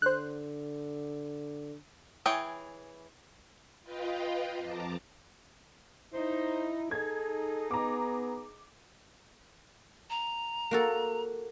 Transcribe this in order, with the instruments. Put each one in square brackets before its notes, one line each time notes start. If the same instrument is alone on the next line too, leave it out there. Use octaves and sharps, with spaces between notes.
[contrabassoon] D3 [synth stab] C5 F#6
[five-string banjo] E3 G#4 C#5 G5
[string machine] F4 B4 D#5 F5 G5
F2 A5 A#5 D6
[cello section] D#4 [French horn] E4 [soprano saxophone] C5
[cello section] D#4 [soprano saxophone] G#4 [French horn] A4 [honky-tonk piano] G#6
[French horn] B3 [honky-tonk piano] A#5 D6
[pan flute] A#5
[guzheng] A#3 F#4 A4